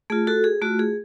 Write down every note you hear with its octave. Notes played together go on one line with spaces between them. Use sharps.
A3 F4 G#4
F#4 A4
G#4
A3 F4 F#4
G#4